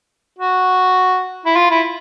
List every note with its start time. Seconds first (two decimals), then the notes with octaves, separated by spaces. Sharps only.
0.39 F#4
1.46 E4
1.56 F4
1.71 E4